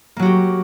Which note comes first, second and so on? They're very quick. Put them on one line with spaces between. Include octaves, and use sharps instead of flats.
A#3 F#3 F#4 G4